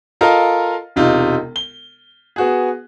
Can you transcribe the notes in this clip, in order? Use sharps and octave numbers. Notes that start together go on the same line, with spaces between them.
F4 A4 A#4 D#5 F5
E1 C3 D#4 F4
G7
B3 F#4 G#4